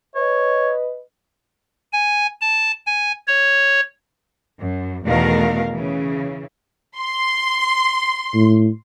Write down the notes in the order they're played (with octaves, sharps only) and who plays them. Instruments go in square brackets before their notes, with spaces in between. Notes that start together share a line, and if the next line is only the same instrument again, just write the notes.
[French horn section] B4 D#5 [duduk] C#5
[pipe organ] G#5
A5
G#5
C#5
[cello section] F#2
E2 B2 D#3 A3 A#4 F5
C#3 E3
[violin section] C6
[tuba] A2